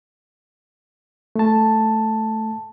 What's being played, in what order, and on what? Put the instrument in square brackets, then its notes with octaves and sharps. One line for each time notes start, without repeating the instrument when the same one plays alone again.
[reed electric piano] A3 A5